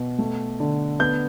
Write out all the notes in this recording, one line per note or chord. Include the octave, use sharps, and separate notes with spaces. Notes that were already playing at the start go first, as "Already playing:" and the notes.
Already playing: B2 B3
A3
D3
B3 G6